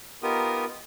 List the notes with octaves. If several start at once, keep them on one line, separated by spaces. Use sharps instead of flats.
B3 D#4 F4 G4 A#4 D#6